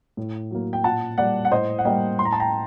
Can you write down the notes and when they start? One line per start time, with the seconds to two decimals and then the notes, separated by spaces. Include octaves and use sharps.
0.17 A2
0.51 F#3 A#3
0.73 G5
0.84 A#2 F#5 A5
1.18 G3 A#3 D5 F#5
1.45 F#5
1.51 A2 C5 D#5
1.79 F#5
1.85 G3 A#3 D#5 G5
2.19 A2 C6
2.25 A#5
2.33 A5
2.40 G5 A#5